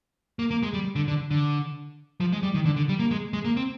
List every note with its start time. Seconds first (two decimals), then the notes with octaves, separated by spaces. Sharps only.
0.39 A#3
0.51 A#3
0.63 G#3
0.73 G3
0.96 D3
1.08 D3
1.31 D3
2.21 F3
2.32 G#3
2.43 G3
2.54 D#3
2.65 D3
2.77 D3
2.89 G3
2.99 A#3
3.11 G#3
3.33 G#3
3.45 A#3
3.57 C4